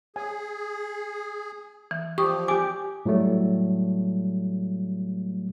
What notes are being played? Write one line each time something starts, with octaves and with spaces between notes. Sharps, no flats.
G#4 G#5
E3
F3 G4 C#6 D#6
G4 G#5 D6
A2 F#3 G3 A3